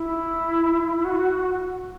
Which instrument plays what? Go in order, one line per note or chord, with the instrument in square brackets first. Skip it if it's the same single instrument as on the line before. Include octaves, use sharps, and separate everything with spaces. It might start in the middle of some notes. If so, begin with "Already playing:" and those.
Already playing: [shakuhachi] E4
F#4